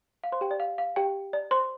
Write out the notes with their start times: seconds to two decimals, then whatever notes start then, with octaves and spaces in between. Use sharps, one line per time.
0.24 F5
0.32 C5 C6
0.41 G4 G5
0.51 D5
0.60 F5
0.78 F5
0.96 G4 G5
1.33 D5
1.51 C5 C6